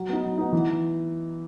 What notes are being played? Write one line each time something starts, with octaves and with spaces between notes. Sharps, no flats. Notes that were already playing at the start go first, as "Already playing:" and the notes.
Already playing: F#3
B3 D#4
F#3
B3 D#4
E3